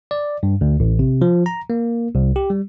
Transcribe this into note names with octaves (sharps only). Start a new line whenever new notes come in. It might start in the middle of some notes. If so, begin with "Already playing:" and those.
D5
G2
D2
A1
C3
F3
A#5
A#3
C2
G4
G3